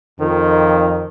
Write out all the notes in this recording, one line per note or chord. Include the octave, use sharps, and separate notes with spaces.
F2 D#3